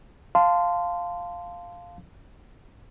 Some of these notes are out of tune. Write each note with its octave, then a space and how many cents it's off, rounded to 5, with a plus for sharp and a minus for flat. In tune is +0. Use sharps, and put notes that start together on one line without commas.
F5 +0 A5 +0 C6 -15